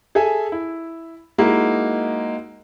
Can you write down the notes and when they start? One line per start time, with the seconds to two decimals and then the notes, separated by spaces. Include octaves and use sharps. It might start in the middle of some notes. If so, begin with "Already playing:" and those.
0.15 G#4 A4 E5 G#5
0.52 E4
1.38 G#3 A#3 D#4 E4 F#4